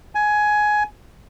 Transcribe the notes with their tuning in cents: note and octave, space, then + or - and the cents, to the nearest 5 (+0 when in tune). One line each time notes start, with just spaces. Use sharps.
G#5 +15